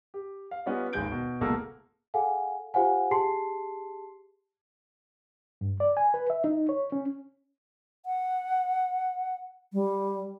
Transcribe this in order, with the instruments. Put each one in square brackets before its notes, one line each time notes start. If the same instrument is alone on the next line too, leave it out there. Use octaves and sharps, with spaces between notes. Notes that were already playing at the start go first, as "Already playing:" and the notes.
[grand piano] G4
F5
G3 B3 C#4 F4 D#5
G#1 D#2 G#3 G#4 G6 D7
B2
F#1 B2 G#3 A#3 A4 E6
[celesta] G#4 A4 F5 F#5 G#5
F4 G4 C5 F5 F#5 G#5
G4 G#4 A5 C6 C7
[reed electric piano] G2
D5
G#5
B4
E5
D#4
C#5
C#4
[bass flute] F#5
G3